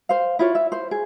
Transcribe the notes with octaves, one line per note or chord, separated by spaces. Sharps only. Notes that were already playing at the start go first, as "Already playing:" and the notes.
C5 F5
E4 F4 C#5
E5
C5
G#4